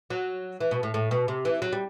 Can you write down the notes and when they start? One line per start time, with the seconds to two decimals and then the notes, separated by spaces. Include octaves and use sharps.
0.10 F#3
0.60 E3
0.71 B2
0.83 A2
0.94 A2
1.11 B2
1.28 C3
1.45 E3
1.62 F#3
1.73 G3